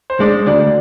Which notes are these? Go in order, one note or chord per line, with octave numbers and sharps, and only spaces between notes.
C5
G#3 D4 D5
D2 D4 D5